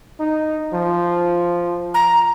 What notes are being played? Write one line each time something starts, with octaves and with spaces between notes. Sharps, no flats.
D#4
F3
A#5